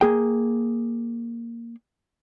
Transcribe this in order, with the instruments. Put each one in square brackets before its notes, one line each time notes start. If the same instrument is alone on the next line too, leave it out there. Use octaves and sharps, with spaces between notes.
[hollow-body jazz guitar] A#3 G#4 G5